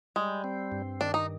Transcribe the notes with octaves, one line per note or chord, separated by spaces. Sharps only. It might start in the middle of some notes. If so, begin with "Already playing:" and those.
G3 G#3
C4
G2
D#3 D4
D#4